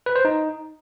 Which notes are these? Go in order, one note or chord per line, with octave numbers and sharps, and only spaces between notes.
B4
C5
D#4